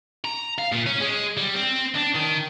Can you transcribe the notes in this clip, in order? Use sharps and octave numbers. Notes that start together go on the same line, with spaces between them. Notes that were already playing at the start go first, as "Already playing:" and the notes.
A#5
F5
A#2
C#4
G#3
G3
C4
D4
D#3